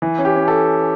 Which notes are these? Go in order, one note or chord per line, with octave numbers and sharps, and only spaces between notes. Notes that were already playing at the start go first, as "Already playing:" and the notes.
E3
C#4
G4
C#4
A4